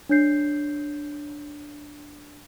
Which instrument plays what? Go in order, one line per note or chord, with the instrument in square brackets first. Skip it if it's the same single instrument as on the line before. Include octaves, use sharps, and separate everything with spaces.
[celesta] D4 C#5 G6 C7